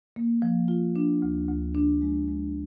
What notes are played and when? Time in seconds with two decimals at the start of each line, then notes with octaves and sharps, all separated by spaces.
0.16 A#3
0.42 F3
0.68 F4
0.96 D4
1.22 D2
1.49 D2
1.75 D4
2.01 G#3
2.28 G#3